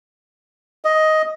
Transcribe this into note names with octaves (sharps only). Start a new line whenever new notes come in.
D#5